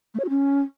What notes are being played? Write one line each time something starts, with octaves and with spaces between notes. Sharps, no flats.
A3
C#5
F#4
C#4